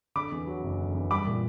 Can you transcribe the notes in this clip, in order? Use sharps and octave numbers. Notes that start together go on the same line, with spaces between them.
D3 B5 D6
E2
F#3
F#1
D3
E2
G3 B5 D6
A#2